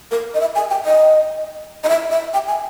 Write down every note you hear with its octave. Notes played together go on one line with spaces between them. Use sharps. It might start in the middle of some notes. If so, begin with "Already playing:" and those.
A#4
D#5
E5
G#5
G5
D#5
D#5
E5
E5
G5
G#5